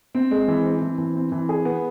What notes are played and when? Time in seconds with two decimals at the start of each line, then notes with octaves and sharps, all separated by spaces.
0.15 C4
0.31 G#3
0.48 E3
0.65 C4
0.82 E3
0.98 E3
1.15 C4
1.32 E3
1.49 G#4
1.65 B3